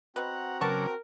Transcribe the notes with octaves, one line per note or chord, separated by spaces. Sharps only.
B2 C4 F#4 B4 F#5 A#5
C#3 F#3 B3 A#4 A5 C#6 D6